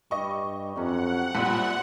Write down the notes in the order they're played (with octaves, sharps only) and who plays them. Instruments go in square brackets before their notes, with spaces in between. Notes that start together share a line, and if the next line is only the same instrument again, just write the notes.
[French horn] G2 [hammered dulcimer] G3 [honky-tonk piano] D#5 C#6
[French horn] F2 [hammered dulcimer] C3 F#3 C#4 [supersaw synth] F#5
[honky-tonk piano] A#1 A#2 [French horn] G3 [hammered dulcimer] B4 C5 E5